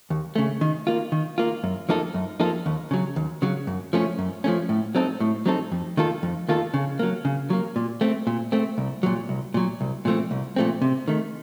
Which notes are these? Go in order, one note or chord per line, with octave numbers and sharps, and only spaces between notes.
D#2
C#3 A3
D#3
A#3 F4
D#3
A#3 F4
F#2
F3 A#3 D#4 A4
F#2
F3 A#3 D#4 A4
D#2
C#3 F#3
D#2
C#3 F#3
F#2
F3 A3 C#4
F#2
F3 A3 C#4
A2
F#3 C4 D#4 A4
A2
F#3 C4 D#4 A4
F2
D#3 A#3 F4 A4
F2
D#3 A#3 F4 A4
C#3
F#3 A#3
C#3
F#3 A#3
A#2
A3 C4
A#2
A3 C4
C2
A#2 F#3
C2
A#2 F#3
C2
A#2 F3 A3 C4
C2
A#2 F3 A3 C4
C3
D#3 A3